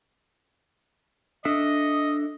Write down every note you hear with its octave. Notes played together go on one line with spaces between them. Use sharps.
D4 A4 D#5 E5